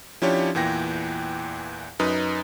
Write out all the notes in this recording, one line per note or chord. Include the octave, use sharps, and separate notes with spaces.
F3 C#4 D4 E4 G4 C#5
E2 A#2 E3 G5 A#6
F#2 D#4 B4 D#6